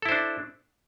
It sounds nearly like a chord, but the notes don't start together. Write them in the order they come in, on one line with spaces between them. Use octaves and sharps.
A4 E4 C5 D4